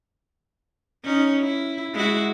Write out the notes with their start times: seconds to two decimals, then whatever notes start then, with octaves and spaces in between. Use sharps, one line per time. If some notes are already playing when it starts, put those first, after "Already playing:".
1.04 C#4 D#4
1.42 E4
1.94 G#3 E4 F#4